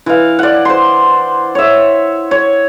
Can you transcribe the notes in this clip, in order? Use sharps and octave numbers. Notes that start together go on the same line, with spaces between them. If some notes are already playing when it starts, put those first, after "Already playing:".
E3 F5
D5 F#5
C5 C6
C#5 E5
C#5